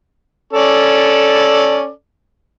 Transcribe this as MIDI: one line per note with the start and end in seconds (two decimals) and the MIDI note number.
0.53 1.90 61
0.53 1.90 69
0.53 1.90 74